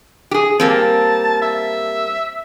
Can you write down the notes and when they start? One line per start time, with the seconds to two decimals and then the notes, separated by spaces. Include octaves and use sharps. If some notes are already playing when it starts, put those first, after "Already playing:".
0.31 G4 G#4
0.60 G3 A#3 C4 A5
1.42 E5